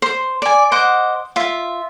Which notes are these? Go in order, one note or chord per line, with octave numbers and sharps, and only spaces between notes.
C5
D5 G#5
C5 D#5 F#5 D6
F4 E5